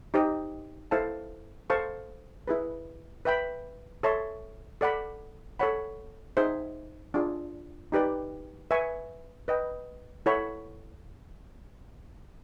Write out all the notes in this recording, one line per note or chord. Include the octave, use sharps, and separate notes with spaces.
D#4 G4 C5 D#5
E4 A4 C5 F5 A5
A4 C5 F5 A5 C#6
E4 G#4 B4
B4 E5 G5 B5
A4 C#5 E5 A5 C6
A4 D5 F#5 B5
A4 C#5 F#5 B5
D#4 G#4 C5 E5
D4 F4 G#4
D#4 G4 B4 D5
B4 E5 G#5 C#6
B4 D#5 G5
E4 A4 C#5 F#5 B5